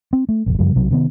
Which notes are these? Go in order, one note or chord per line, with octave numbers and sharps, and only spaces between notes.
C4
A3
F1 A#1
F#2 C#3 F3 G3
B1 C3 F#3
C3 D#3 A3 B3